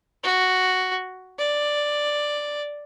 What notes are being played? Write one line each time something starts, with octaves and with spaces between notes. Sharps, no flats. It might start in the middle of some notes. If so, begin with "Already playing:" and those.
F#4
D5